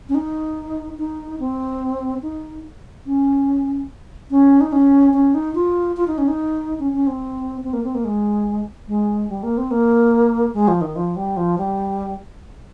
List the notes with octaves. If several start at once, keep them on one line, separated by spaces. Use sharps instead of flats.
C#4
D#4
D#4
C4
D#4
C#4
C#4
D#4
C#4
C#4
D#4
F4
F4
D#4
C#4
D#4
C#4
C#4
C4
C4
A#3
C4
A#3
G#3
G#3
G3
A#3
C4
A#3
G#3
F3
D#3
F3
G3
F3
G3